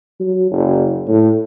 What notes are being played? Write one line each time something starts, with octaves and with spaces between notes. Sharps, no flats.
F#3
F#1
A2